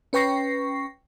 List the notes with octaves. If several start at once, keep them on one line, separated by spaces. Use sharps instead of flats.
C#4 B4 G5 C#6 A#6 C7